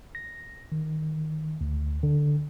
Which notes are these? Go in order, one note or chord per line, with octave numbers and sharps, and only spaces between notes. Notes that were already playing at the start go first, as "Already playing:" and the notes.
A#6
D#3
D2
D3